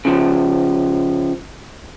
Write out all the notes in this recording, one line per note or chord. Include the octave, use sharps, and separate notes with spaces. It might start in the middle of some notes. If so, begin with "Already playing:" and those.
C#3 F3